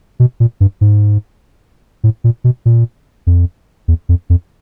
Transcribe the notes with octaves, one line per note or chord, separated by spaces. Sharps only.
B2
A#2
G2
G#2
A2
A#2
B2
A#2
F2
E2
F2
F2